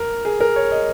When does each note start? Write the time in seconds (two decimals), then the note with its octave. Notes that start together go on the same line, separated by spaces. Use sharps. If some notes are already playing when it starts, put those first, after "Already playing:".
Already playing: A#4
0.25 G#4
0.40 A#4
0.56 C#5
0.71 D#5